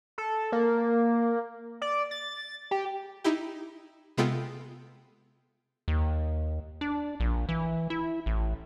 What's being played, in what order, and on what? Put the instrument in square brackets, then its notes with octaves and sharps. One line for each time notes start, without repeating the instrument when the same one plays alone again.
[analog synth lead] A4
A#3
D5
A6
G4
[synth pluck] D#4 E4 G4
C3 G#3 B3 F4 A4 G5
[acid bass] D#2
D4
A#1
E3
E4
A1